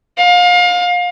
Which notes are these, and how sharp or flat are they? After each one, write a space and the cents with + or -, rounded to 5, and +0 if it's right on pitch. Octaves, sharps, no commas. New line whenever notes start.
F5 +30